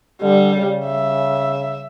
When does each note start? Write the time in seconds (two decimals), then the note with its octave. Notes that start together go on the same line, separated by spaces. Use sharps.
0.22 D3 G3
0.55 C#3
0.87 E5